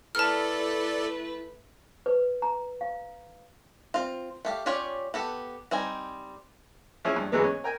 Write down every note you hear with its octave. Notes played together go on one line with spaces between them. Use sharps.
A3 E4 A4 B4 D5 A5 F6
B4
A#5
F5
C4 F4
A3 G4 F5
C#4 F4 G4 C#5 D5
B3 G4 A4
G3 C4 D#4 G#5
F3 G#3 C#4 E4
G2
G#2 C#3 E3 F#3 G#3 B3
C#4
A#4 G5 G#5